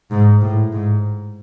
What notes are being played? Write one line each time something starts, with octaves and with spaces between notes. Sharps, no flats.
G#2
A2
G#2